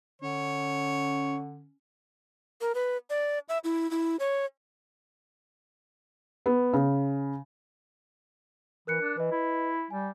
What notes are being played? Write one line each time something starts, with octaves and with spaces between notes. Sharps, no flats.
D3 C#4 C#5
A#4
B4
D5
E5
E4
E4
C#5
B3
C#3
E3 A#4 F#6 C#7
D4
E3 B4 D#5
E4
G3 G#5